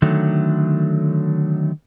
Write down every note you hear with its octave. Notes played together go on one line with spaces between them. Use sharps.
D3 D#3 F#3 A3